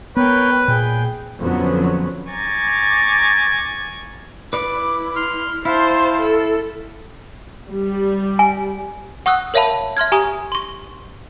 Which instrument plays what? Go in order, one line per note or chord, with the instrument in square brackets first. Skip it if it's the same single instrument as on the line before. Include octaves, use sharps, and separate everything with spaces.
[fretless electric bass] B3 [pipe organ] A#4 C#5 G5 [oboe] B4
[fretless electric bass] A#2 [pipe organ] G#4 G5
[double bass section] F2 D3 F3 F#3 B3 C#4
[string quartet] G#5 A#5 C#6 D6 G#6 A6
[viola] E4 [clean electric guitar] B4 D5 [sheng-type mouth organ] D6
[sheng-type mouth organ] C6 F6
[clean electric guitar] E4 [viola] C5 A5 [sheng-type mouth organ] F5
[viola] A4
[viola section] G3
[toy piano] G#5
[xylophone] F#5 C#6 D#6 E6 F#6
A#4 C#5 E5 F5 A5 B5
E5 C6 F6 G#6
G4 G#5 A#5 C#6 D#6
C6 C#6